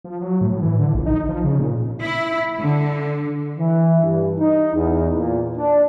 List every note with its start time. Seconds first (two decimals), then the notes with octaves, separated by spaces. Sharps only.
0.04 F3
0.21 F#3
0.41 A2
0.62 E3
0.79 D3
0.94 A#1
1.06 D#4
1.29 F3
1.44 C#3
1.59 A#2
2.03 E4
2.59 D3
3.58 E3
4.01 G2
4.39 D#4
4.74 E2
5.14 A#2
5.57 D4